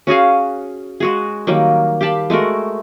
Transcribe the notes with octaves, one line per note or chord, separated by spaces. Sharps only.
C#4 F#4 G#4 F5
G#3 F#4 G#4
D#3 F#3 G3 A#3
G4 F5 A5 B5
G#3 A3 F#4 A#4